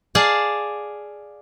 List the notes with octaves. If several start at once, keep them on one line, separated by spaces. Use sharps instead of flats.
G#4 D5 F5 A5